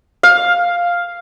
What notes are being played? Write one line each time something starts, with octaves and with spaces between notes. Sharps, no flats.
F5